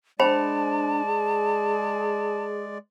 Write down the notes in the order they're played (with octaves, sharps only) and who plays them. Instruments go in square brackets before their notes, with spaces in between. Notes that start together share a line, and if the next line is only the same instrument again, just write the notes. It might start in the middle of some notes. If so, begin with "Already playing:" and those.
[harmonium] G#3 D5 [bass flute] D4 [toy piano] C5 G5 B5 [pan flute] A5
[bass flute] G#4